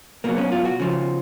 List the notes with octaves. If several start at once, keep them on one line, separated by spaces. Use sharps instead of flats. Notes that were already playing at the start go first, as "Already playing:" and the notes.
B2 F#3 A#3
C#4
F4
F#4
C#3 F3